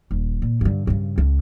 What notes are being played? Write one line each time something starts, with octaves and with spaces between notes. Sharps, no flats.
D#1
A#2
G2 D3
G2 C#3
C#2